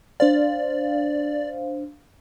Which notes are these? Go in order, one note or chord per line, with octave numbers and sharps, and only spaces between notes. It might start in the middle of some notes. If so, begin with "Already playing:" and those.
D4 C5 D5 F5